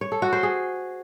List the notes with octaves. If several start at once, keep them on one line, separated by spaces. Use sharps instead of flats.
C#5
A4
F#4
C5
G#4